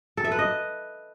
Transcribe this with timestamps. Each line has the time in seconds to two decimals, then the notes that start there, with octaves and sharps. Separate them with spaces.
0.17 A4
0.24 E5
0.32 B4
0.39 D#5